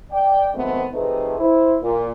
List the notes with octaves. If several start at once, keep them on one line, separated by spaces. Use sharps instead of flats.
D5 G5
D#3 F#3 G#3 A3 B3 C4
C3 F3 A3 D#4 G#4 B4
E4 C5
A#2